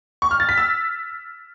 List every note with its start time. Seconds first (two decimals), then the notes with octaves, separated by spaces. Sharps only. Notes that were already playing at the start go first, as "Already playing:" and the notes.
0.22 C#6
0.31 F6
0.40 A6
0.49 B6
0.58 E6